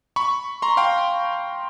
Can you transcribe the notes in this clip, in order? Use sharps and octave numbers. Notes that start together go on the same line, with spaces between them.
B5 C#6
A#5 C6
F5 G5